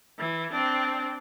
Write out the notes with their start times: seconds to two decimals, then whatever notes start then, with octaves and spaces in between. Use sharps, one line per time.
0.19 E3
0.51 C4 D4